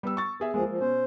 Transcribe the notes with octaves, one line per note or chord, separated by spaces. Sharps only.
G3 B3 E6
C#6 A6
B3 G#4 E5
D2 F3 G#3 A#3 G#4
F3
B2 C#4 C5